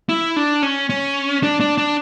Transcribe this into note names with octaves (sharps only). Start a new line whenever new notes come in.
E4
D4
C#4
C#4
D4
D4
D4